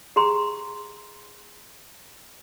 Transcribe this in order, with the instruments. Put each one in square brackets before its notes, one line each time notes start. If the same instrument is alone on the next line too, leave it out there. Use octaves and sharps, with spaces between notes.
[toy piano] G4 G#4 A#5 C6